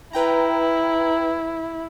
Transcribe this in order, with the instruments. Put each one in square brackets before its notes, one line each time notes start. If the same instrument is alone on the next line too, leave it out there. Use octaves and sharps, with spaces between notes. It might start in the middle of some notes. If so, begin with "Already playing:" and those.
[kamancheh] E4 [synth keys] B4 G5 A#5